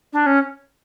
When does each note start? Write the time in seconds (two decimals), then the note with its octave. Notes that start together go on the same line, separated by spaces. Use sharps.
0.13 D4
0.26 C#4